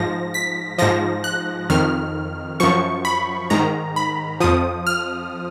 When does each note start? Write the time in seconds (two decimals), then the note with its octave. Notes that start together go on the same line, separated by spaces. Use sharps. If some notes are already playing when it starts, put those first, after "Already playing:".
Already playing: G#2 F3 A#6
0.34 B6
0.78 G#2 F3 A#6
1.24 F#6
1.70 F2 D#3 F6
2.60 F#2 F3 C#6
3.05 B5
3.50 G#2 D#3 A#5
3.96 B5
4.40 F2 F3 D#6
4.87 F6